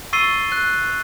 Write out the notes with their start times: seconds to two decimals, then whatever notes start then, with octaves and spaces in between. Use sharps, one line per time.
0.13 C#6 E6 A6 C7 D#7 G7
0.52 F#6